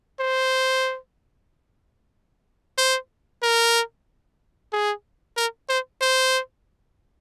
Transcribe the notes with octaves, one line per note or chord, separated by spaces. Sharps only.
C5
C5
A#4
G#4
A#4
C5
C5